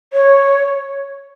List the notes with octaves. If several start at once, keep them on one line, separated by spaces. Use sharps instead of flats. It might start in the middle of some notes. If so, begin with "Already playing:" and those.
C#5